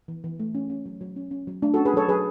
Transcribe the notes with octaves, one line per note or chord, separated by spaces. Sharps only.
E3
E3
A3
C#4
C#4
F#3
F#3
C#4
C#4
F#3
A3 D4
F#4 A4
C#4
G#4 B4
F#3 A4 C#5
F#3 G#4 B4